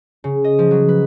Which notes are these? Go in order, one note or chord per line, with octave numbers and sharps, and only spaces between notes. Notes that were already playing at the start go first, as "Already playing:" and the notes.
C#3
D#5
F3
F#3
B4